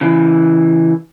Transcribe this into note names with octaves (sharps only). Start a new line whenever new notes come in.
C#3 E3